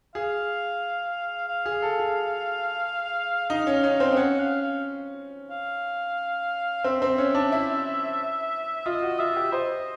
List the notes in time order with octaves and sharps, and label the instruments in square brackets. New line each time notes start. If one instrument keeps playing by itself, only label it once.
[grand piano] G#4 [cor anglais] F5
[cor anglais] F5
[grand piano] G#4
A4
G#4
[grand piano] D#4 [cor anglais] F5
[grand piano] C#4
C#4
C4
C4
[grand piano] C#4 [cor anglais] F#5
[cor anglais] F5
F5
F5
[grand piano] C4 [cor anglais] E5
[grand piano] C4
C#4
D4
E4
[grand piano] F4 [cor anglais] D#5
[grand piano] F#4
[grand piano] F4 [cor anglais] E5
[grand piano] G4
[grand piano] C5 [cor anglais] D#5